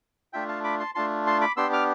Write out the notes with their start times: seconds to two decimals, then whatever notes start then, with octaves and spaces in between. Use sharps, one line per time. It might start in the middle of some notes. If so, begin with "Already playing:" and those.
0.33 A3 D4 F4 E5 G5
0.48 F5 A5
0.64 B5 D6
0.80 A5 C6
0.95 A3 D4 F4 A5 C6
1.27 A5 C6
1.41 B5 D6
1.57 B3 D4 G4 C6 E6
1.73 D6 F6